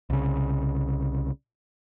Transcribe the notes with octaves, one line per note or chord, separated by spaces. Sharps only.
C2 C#3